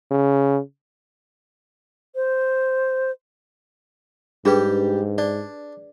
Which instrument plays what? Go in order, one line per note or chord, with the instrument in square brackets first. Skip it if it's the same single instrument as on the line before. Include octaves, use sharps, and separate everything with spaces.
[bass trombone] C#3
[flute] C5
[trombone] G#2 [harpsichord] G3 G4 [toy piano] D4 G#4 B4
[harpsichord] D4 [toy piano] D5